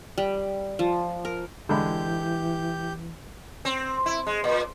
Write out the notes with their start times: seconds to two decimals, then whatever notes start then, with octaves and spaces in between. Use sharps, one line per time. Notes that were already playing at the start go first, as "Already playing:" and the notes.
0.18 G3
0.79 F3
1.25 A#4
1.69 D3 E3 G#3 G4 B5 G6
3.65 C4
4.06 E4
4.27 G#3
4.44 A#2